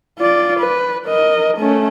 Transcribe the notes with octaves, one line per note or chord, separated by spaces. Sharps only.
F4 D5
B4
A#4 D#5
A3 C#4